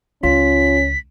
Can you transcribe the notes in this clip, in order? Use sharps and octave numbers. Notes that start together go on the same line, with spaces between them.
C#2 C#4 F4 B6